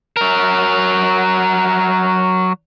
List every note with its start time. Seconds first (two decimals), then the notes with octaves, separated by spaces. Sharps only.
0.17 F#3 A#4